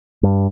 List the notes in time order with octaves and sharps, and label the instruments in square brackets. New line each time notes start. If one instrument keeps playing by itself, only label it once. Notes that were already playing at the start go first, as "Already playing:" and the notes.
[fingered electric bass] G2